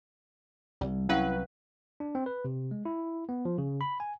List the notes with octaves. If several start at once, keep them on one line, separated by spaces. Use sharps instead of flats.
C2 G3
F#3 C#4 E4 B4 F5 F#5 F#6
D4
C4
B4
C3
G#3
E4
B3
F3
C#3
B5
G#5